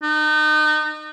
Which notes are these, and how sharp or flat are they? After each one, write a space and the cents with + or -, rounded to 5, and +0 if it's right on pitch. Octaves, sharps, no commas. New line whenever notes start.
D#4 -30